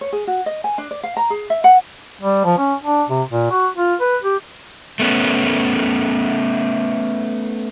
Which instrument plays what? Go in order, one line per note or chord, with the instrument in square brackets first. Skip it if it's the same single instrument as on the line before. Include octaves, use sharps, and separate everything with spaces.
[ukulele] C#5
G#4
F#4
D#5
G#5
D4
D5
F5
A#5
G#4
E5
F#5
[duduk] G3
F3
C#4
D4
C3
A#2
F#4
F4
B4
G4
[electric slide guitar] A3 B3 C#4